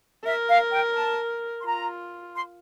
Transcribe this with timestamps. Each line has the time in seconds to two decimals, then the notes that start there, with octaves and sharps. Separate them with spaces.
0.24 A#4 E5
0.48 F5
0.72 G5
0.95 A5
1.60 C6
1.65 F4 A#5
2.35 C6